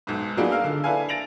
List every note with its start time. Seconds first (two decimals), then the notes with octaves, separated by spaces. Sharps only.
0.07 B1 G#2
0.37 F#3 A#3 B3 D4 D#4 G#4
0.51 A#4 F5 E6
0.64 D3
0.84 D4 E4 A4 B4 F5 G#5
1.09 A6 A#6 D7 F7 F#7